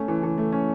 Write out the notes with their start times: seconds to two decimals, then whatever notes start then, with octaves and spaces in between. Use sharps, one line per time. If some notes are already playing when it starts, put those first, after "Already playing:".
Already playing: A3 C#4
0.08 E3
0.23 E3
0.38 A3
0.53 C#4